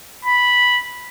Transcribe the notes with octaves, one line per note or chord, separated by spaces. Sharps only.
B5